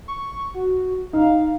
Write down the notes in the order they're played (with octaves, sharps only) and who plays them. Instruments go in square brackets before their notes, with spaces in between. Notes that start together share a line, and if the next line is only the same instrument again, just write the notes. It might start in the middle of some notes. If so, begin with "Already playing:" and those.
[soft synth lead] C#6
F#4
[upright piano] D#4 [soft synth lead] F5